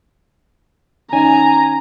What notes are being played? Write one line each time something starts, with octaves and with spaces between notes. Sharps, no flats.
D#3 C#4 D#4 G#5 A#5